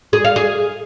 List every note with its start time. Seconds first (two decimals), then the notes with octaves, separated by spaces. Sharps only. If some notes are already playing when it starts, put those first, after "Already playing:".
0.13 G#4
0.24 F5
0.36 G#4